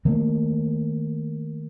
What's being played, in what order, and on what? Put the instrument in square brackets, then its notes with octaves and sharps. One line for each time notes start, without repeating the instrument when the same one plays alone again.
[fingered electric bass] D#3 A3 A#3